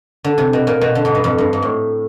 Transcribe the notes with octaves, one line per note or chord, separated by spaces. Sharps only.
D3
C3
B2
A#2
B2
D3
G#2
G2
F2
G2
G#2
A2